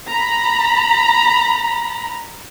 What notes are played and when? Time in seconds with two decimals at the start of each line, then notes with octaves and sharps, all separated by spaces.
0.12 A#5 B5